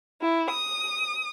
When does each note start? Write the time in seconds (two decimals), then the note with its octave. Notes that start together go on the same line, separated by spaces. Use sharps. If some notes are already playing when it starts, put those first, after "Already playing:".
0.21 E4
0.51 D#6